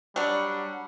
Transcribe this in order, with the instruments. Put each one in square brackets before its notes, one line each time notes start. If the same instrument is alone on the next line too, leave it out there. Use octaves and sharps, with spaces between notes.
[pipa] F#3 D4 [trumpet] G3 [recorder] F#5